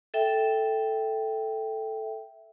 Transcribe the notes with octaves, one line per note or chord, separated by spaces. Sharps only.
A4 E5 G5